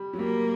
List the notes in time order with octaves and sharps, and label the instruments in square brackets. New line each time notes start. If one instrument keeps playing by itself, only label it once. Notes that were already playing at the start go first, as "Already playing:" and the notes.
Already playing: [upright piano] G3
F#3
[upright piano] G3 [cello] A#3